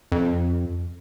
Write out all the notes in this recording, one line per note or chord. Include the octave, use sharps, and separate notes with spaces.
F2